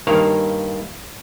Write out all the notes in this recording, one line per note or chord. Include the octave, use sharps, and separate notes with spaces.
G2 D#3 A#3 C#5 F5